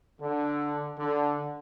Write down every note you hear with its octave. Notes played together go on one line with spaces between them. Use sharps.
D3
D3